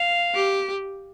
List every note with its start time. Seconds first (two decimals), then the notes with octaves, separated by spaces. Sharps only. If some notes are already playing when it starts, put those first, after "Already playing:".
Already playing: F5
0.35 G4